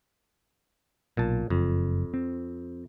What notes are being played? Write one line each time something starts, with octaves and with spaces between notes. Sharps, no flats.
B1 A#2 A5
F#1 F2
C4